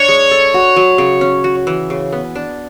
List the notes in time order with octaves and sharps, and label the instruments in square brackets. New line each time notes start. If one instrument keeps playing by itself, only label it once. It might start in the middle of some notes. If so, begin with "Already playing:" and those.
Already playing: [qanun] D4 [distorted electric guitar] C#5
[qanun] G#3
A4
F#4
F#3
C#3
C#4
F#4
E3
C#3
B3
D4